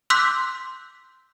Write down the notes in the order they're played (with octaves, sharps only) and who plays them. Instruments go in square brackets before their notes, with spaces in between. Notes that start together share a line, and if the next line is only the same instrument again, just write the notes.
[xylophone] C6 D6 E6 F#6 G6 B6